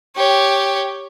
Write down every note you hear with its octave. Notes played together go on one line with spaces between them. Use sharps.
G4 C#5